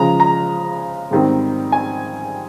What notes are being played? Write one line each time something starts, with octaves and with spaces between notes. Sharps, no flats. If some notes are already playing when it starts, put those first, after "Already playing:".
Already playing: C#3 F3 G#3 A#5
A#5
G#2 D#3 G3 C4
G#5